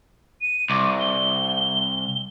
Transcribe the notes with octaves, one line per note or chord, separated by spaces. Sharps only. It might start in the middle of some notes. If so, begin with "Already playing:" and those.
D#7
C2 D6
G7